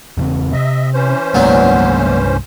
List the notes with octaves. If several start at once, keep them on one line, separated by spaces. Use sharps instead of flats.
E2 C#3 C4
C3 D#5 E5
E3 C#4 C5
C2 G2 A#2 F#3 G#3 B3